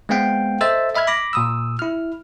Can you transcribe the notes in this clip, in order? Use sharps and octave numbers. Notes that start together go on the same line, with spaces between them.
G#3 B3 C4 F5 G5
A4 C5 D#5 E5 E6 A6
D#5 E5 B5 F6 G#6
B5 D6 A#6
A#2 D#6 E6
E4 F6